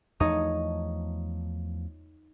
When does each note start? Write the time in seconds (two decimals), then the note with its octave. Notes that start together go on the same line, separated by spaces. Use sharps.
0.20 E2 F3 A3 D#4 C#5 D#5